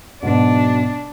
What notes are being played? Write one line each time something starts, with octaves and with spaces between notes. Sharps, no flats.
G#2 B2 F#3 D4